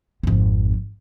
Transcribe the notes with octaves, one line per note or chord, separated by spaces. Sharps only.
G#1 F2